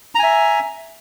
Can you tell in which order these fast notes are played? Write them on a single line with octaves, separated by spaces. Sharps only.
A#5 G#5 E5